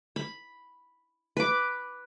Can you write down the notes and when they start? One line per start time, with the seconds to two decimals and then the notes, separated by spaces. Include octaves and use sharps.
0.16 B5
1.37 B4 D6